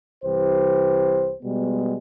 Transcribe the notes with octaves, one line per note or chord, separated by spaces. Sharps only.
C2 E3 G4 B4 C5
B2 G3 G#3 B3